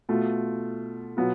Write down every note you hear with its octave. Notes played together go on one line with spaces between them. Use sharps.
B2 A3 F4
B2 F#3 B3 F4